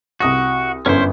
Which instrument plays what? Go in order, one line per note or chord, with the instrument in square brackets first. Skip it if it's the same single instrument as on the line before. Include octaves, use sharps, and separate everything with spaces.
[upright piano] C2 D#6 A#6 [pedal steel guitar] F#4
[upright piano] G1 F#2 [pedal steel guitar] C#4 E4 C5